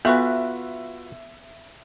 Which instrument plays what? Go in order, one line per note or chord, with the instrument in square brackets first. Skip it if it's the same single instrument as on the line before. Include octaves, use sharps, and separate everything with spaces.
[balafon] B3 A4 [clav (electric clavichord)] F4 F#4 B4 [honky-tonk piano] E5